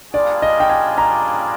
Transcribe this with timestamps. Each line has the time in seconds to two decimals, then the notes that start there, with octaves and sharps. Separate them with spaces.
0.14 G3 A#3 D4 F4 G#4 D5
0.42 D#5
0.60 G5
0.70 G#5
0.98 A#5